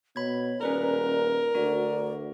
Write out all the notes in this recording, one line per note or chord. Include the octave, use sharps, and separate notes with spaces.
B2 C#5 B5 G#6
D#1 C#4 A#4 B4 D5 A#5
D2 F#4 D5